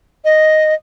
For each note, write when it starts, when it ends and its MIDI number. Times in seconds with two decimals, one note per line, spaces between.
0.25 0.74 75